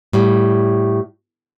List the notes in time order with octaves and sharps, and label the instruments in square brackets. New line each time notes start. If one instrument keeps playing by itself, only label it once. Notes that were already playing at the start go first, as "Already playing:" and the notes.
[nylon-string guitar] A2 G3